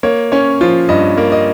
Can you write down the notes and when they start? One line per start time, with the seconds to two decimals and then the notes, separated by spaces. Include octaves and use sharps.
0.03 A#3 C#5
0.32 C#4 C#5
0.61 F3 F4
0.89 G2 D#5
1.18 A#3
1.32 D#5